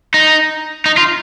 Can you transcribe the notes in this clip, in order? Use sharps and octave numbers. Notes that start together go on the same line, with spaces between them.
D#4
D#4
F4